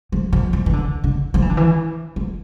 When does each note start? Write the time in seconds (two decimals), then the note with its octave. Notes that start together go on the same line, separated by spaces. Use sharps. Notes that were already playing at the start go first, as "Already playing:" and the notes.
0.12 F3
0.33 F3
0.53 F3
0.66 E3
0.73 D3
1.04 D3
1.34 F3
1.42 E3
1.49 D3
1.57 E3
2.16 F3